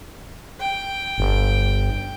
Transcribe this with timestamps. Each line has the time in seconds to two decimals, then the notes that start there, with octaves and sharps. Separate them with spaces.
0.60 G5
1.18 G1